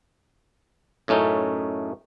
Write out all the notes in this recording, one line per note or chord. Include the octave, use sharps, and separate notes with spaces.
F#2 A2 A3 C#4 D#4